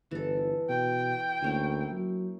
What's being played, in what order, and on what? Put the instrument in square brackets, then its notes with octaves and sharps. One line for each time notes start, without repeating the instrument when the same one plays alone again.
[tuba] G1 [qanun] E3 A4
[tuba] B2 [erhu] G5
[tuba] D2 [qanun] A#3 C#4 E4
[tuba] F#3